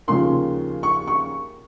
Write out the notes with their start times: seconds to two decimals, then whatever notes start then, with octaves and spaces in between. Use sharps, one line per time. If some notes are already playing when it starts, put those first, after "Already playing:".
0.08 D#2 C#3 F3 C6
0.83 C#6
1.07 C#6